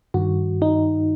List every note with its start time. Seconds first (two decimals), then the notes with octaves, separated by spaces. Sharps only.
0.14 G2 D#3 F#4
0.62 D#4